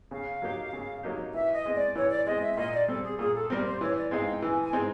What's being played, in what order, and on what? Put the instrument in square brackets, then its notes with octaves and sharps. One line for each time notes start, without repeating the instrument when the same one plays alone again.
[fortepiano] C#3 [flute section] F5
[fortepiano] F#3 A#3 D#4 G4
C#3
F#3 A#3 D#4 G4
[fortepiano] E3 [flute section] E5
[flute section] D#5
[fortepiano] G#3 C4
[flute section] D5
[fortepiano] E3 [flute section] C#5
[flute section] D5
[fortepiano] G#3 C4 [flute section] D#5
[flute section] E5
E5
[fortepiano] A#2 [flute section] D#5
[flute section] D5
[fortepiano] G3 C4 [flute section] A4
[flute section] G#4
[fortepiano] A#2 [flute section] G#4
[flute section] A4
[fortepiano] G3 C4 [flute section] A#4
[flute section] C5
[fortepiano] E3 [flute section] C#5
[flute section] D5
[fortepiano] G#3 C4 D#4 [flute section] F5
[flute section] G5
[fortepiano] E3 [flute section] G#5
[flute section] G#5
[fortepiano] G#3 C4 D#4